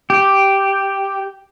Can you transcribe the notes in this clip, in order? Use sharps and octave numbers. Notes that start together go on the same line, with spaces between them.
G4